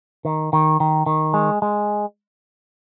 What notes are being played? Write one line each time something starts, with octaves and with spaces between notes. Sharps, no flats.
D#3
D#3
D#3
D#3
G#3
G#3